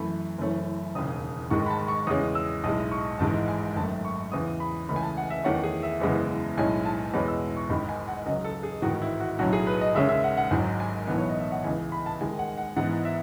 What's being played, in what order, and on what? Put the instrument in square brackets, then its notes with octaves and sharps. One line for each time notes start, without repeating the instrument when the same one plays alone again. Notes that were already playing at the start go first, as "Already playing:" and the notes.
Already playing: [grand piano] F#2 E3 A3 B5
F#1 F#2 E3 A3 C#4
E1 D#2 C#3 D#6
G#1 G#2 D#3 G#3 C#6
B5
A5
C#6
E2 C#3 G#3 C#4 D#6
E6
B1 A2 G#3 D#6
C#6
G#1 G#2 E3 G#3 A5
G#5
G#1 F#2 D#3 A3 A5
C#6
E2 C#3 E3 D#6
B5
C#2 C#3 E3 A3 B5
G#5
A5
F#5
E5
E2 D#3 A3 C#4 F#5
G#4
E5
F#1 E2 C#3 G#3 B3
B1 A2 G#3 C#4 G#5
A5
E2 B2 G#3 C#4 B5
E6
C#6
G#1 G#2 D#3 B5
G#5
F#5
C#2 C#3 F#3 D#5
A4
G#4
A1 G#2 D#3 F#4
E4
F#4
B1 A2 F#3 C#4 F#4
G#4
B4
D#5
D#2 C#3 G#3 C#4 E5
E5
F#5
F#5
G#1 G#2 F#3 G#5
G#5
B1 A2 E3 B3
C#5
D#5
E5
F#5
C#2 C#3 E3 G#5
B5
A5
D#2 D#3 G#3 G#5
F#5
F#5
G#2 E3 B3 F#5
E5